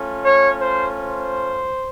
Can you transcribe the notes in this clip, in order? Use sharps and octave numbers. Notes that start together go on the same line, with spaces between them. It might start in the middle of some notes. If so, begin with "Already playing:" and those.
Already playing: A3 C#4 F4
C#5
C5
C5